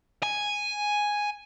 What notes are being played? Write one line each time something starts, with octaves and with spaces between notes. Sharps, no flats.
G#5